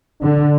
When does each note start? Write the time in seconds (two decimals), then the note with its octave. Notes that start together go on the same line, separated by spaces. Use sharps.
0.21 D3 D4